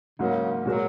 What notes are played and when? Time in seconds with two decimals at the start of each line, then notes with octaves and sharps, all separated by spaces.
0.19 G#2 C#3 F#3 A#3
0.65 A#2 F#3 G#3 F#4 A#4